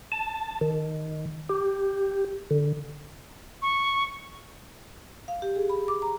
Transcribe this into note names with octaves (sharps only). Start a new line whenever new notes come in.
A5
D#3
G4
D3
C#6
F5
G4
G#4
B5
D6
A#5